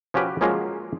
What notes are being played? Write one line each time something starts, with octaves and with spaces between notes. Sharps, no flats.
F3 C#4 F#4 G4 B4
F3 F#3 G#3 A#3 C#4 F4